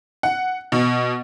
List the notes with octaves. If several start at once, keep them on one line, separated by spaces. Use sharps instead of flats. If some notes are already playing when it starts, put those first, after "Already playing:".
F#5
B2